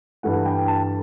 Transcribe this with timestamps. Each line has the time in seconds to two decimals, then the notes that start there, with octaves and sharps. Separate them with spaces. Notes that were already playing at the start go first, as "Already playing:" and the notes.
0.23 G2 E3 A3 F#5
0.46 G5
0.68 A5